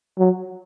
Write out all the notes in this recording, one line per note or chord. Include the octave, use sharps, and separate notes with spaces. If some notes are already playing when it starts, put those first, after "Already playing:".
F#3